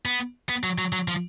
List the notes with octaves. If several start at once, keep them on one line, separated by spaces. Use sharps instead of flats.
B3
B3
F#3
F#3
F#3
F3